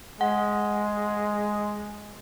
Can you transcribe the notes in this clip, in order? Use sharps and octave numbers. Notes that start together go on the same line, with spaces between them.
G#3 F#5